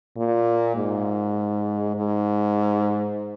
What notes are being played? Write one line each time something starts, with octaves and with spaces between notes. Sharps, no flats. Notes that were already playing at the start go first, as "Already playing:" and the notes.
A#2
G#2
G#2